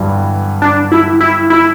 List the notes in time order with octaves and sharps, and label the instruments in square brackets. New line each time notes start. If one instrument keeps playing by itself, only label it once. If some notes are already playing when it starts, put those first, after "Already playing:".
Already playing: [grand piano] G2 D3 E3 F#3
[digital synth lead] D4
E4
E4
E4